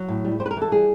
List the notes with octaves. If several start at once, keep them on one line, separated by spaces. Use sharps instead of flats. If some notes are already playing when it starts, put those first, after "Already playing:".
Already playing: F#3
A2
G3
G3 C5
B4
A#4
E3
A4
G3 G#4